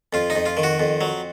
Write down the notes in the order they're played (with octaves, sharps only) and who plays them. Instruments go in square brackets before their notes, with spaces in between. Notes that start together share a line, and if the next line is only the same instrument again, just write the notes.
[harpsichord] F2 F4
D#4
F2
F4
D#3
F#4
F2
F#3